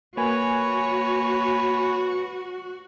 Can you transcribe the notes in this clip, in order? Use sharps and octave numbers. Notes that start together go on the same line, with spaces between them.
A#3 F#4 B4 C#5 G#5